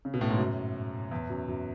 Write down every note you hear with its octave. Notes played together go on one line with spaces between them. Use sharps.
C#3
B2
A2
G#2
F#2
E2
F#2
F#2